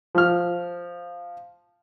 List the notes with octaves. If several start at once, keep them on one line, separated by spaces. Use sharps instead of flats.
F3 F6